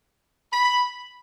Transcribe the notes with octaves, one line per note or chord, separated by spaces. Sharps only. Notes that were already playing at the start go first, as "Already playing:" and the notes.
B5